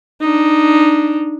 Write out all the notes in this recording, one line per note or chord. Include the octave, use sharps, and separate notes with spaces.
D4 D#4